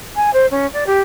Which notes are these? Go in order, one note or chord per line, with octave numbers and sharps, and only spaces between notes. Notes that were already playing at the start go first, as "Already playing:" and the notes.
G#5
C5
C#4
D5
G4